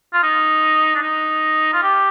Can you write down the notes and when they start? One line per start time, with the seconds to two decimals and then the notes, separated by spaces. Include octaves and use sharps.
0.14 F4
0.23 D#4
0.95 D4
1.02 D#4
1.73 F4
1.83 G4